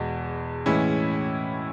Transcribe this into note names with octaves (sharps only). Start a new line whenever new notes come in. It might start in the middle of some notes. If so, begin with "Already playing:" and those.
Already playing: E2 B2 G#3
A2 E3 G#3 C#4 E4